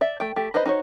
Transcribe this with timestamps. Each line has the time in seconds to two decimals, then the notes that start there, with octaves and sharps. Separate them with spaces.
0.01 D5 E5
0.20 A3 G5
0.36 A3 G4
0.54 D#4 B4 C5 D#5 B5
0.66 D#4 F#4 C5 C#5